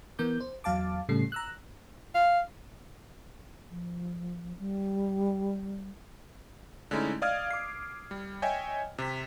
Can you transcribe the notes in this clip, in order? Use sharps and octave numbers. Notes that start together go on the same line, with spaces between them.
E3 B3 A#4 D6 G6
C5
E2 F#3 F5 A5 D6
A2 C#3 G3 A4 C7
A#5 E6 F#6
F5
F3
G3
D3 G#3 A3 C#4 D#4 E4
D5 D#5 F5 D#6 F6 G#6
D6 C7
G3
C#5 D#5 E5 G5 G#5
C3 B6